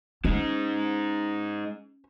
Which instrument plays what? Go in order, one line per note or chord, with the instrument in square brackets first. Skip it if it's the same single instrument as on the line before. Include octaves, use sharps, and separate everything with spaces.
[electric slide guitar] G#3 D#4 [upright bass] C#4